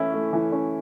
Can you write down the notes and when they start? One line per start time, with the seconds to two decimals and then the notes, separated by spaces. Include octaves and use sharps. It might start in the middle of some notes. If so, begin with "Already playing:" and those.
Already playing: E3 A3 C#4 E4
0.14 A3
0.33 E3
0.52 C#4